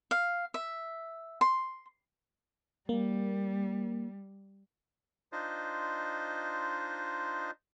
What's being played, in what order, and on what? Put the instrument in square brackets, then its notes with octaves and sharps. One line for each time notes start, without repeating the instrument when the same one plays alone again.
[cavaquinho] F5
E5
C6
[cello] G3 [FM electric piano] A#3
[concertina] D4 D#4 F4 C5 D#5